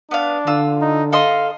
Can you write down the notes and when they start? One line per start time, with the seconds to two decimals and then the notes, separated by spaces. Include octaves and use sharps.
0.11 B3 D4 F5
0.47 D3 F4 E6
0.81 D#4
1.13 A4 D#5 F5 C6